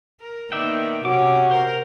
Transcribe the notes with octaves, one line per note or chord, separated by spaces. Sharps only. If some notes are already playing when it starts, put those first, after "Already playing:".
A#4
D#3 A#3 B3 D5 E5 G5
C3 C#4 F#4 D6
A#4 C5